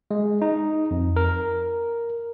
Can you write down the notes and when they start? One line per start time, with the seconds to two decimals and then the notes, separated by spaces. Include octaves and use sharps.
0.11 G#3
0.42 D#4
0.91 F2
1.16 A#4